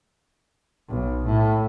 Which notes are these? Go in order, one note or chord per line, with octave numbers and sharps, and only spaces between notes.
B1
A2